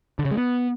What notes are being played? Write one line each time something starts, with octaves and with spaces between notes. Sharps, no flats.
D3
C#3
G#3
B3